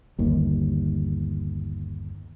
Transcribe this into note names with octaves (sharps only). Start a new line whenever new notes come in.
G1 D#2